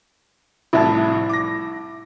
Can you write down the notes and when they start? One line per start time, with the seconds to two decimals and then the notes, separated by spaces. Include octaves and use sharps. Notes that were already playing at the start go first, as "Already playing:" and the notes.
0.73 C2 A2 F3 E4 A5
1.29 D6 A#6